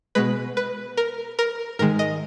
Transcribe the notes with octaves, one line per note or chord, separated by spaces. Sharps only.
B2 G#3 B4
B4
A#4
A#4
G#2 D#3 G#3 A#4
D#5